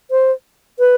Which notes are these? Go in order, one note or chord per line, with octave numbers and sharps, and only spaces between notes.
C5
B4